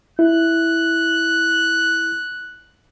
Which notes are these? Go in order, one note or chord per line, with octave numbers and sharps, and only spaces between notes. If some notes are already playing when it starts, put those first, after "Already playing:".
E4 F#6